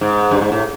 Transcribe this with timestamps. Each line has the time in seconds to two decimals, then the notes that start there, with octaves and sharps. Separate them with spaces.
0.01 G#2
0.31 G2
0.41 G#2
0.52 A2